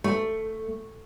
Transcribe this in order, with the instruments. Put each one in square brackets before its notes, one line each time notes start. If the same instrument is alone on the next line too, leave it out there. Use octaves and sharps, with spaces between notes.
[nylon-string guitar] A3